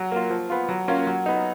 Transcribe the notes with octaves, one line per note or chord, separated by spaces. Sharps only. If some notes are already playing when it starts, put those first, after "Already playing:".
Already playing: F#3
A#3 F4
F3
B3 F4
F#3
A#3 C#4 F4
F#3
B3 D#4